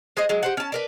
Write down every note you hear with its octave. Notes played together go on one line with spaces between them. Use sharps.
G#3 G#4 C5 D#5
F#3 G#3
G4 C5 F#5
C#4 A5
D4 A#4 B4